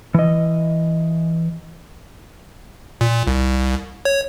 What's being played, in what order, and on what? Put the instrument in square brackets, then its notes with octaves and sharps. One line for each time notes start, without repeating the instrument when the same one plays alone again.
[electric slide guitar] E3 D#5
[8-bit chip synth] A#2
C2
C#5